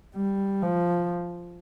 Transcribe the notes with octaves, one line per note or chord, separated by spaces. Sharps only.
G3
F3